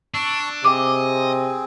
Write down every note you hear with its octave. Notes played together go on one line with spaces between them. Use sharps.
D4 A5 C#6 E6
C3 C4 G#4 D#5 D6